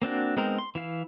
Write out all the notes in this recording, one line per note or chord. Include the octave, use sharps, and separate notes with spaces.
A#3 C4 D4 F#4
G#3 B3 C4 D#4 A#4
C6
E3 E4 F5